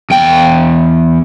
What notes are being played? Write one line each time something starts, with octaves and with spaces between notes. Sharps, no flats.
E2 G5